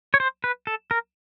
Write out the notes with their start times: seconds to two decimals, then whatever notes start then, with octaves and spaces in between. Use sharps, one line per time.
0.14 C#5
0.20 C5
0.44 B4
0.67 A4
0.91 A#4